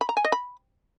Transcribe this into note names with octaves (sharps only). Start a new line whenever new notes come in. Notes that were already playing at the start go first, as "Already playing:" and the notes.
B5
A#5
G#5
D#5
B5